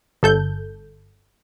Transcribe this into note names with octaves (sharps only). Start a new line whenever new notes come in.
G1 A4 G6